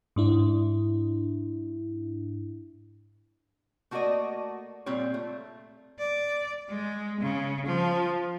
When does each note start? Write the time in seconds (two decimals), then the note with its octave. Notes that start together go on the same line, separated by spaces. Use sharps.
0.16 G#2 D4 E4
3.91 A3 A#3 F#4 G#4 D5 D#5
4.86 A#2 G3 C4 F4 C#5
5.14 A3
5.99 D5
6.69 G#3
7.20 C#3
7.66 F3